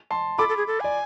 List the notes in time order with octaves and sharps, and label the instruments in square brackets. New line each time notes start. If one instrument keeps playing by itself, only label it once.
[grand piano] A5 C6
[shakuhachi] A4 [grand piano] B5 D6
[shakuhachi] A4
G#4
A4
[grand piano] D5 [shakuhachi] G#5